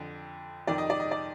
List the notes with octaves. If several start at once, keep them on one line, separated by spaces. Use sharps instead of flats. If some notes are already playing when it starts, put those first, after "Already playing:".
Already playing: F2 D3
F2 D#3 D5
D#5
D5
D#5
D5